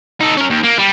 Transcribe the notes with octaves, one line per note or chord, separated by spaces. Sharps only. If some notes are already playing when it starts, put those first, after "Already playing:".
D#4 A4
C#4 A#4
D#2
A#3
G3